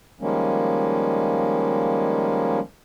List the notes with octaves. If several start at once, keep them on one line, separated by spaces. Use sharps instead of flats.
D#3 F3 G3 G#3 A#3 C#4